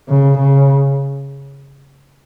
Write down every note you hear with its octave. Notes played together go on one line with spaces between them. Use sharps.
C#3
C#3